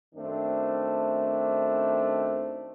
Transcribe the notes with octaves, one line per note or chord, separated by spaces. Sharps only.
F#2 D#3 A3 C4 D4